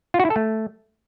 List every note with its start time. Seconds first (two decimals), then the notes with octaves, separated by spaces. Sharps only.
0.14 F4
0.20 F#4
0.25 E4
0.30 A4
0.36 A3